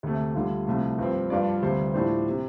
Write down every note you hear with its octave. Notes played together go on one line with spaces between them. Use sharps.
D2 C3 A3
D2 D3 G3 F4
C2 C3 F3 A3 F4
G2 F3 C4
G2 F3 D4 F4 D5
D2 C3 G3 F4 C5
A2 F3 D4 G4 C5
C3